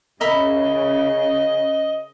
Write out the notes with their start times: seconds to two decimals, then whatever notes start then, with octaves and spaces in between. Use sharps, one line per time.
0.21 C#3 A#4 D#5 E5 B5